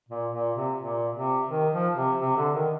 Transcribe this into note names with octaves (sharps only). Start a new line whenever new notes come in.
A#2
A#2
C3
A#2
C3
D#3
F3
C3
C3
D3
D#3